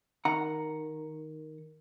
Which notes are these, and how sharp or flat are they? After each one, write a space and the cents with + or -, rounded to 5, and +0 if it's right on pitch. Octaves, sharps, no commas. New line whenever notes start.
D#3 +0 F#5 +0 A#5 +0